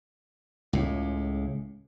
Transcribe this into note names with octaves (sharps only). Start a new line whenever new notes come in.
C#2 A2